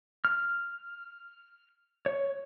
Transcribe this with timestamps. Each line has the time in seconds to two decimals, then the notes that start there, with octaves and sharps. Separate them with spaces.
0.25 F6
2.06 C#5